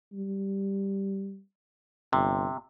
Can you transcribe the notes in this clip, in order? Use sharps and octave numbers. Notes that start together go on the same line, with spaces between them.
G3
G1 C3